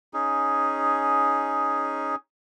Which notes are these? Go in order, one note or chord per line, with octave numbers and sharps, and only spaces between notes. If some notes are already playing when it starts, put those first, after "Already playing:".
C#4 D#4 G#4